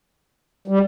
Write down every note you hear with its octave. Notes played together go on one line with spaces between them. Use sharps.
G3